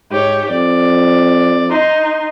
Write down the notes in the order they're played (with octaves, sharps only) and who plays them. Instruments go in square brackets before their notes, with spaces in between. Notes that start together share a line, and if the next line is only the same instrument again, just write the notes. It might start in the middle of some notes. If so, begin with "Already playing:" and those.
[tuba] G#2 [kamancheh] G4 C#5
[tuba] F2 [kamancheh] D5
[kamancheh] D#4 C6